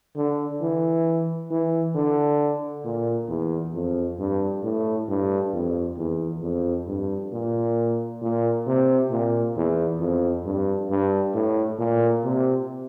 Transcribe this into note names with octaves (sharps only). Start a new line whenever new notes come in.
D3
E3
E3
D3
A#2
E2
F2
G2
A2
G2
F2
E2
F2
G2
A#2
A#2
C3
A#2
E2
F2
G2
G2
A2
A#2
C3